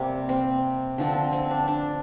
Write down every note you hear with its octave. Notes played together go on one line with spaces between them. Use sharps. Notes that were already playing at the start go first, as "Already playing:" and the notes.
Already playing: C3 G3 A#3 C4
C4
D3 F3 C4
C4
D4
D4